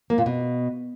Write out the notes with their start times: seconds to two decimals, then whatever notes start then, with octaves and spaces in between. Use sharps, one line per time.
0.10 A#3
0.18 A#2
0.26 B2